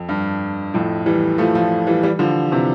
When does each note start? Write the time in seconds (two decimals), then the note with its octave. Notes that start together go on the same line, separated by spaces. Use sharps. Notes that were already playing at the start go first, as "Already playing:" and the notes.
Already playing: F2
0.09 G2
0.74 F2 A2
1.06 E3 G3
1.38 F3 A3
1.55 F3 A3
1.87 E3 G3
2.03 E3 G3
2.19 D3 F3
2.51 C3 E3